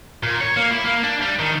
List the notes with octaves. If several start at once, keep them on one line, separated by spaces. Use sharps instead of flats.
A#2
C#5
A#3
E4
A#3
D4
G3
D#3